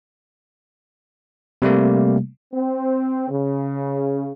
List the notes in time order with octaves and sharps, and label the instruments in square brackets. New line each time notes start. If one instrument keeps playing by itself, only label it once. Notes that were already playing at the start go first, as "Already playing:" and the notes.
[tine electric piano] C3 G3 A3 A#3
[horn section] C4
C#3